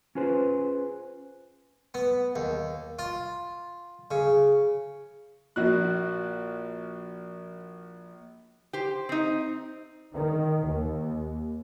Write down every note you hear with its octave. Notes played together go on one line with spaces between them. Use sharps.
C#4 F4 G#4 B4 C5
B3
D#2
F4
C#3
A#1 A#3 F#4 F#6
G4 C5
C4 D#4
D#3
D#2